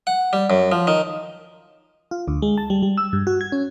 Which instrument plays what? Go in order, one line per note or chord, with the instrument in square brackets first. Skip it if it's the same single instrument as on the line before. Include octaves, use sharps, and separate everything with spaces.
[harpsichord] F#5
G3
F#2
F3
D#3
[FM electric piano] F4
D2
G#3
A5
G3
G3
E6
G2
F#4
G#6
C#4